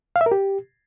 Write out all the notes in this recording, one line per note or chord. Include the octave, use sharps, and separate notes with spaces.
F5
E5
A#4
G4